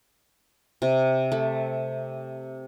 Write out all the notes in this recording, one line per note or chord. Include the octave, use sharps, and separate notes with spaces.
C3
A3